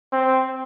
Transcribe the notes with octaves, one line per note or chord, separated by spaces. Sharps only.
C4